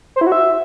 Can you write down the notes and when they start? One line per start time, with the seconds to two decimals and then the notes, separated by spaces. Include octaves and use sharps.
0.16 C5
0.21 E4
0.27 F#4
0.32 E5